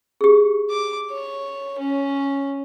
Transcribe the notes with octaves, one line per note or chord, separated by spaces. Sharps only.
G4 G#4
D6
C#5
C#4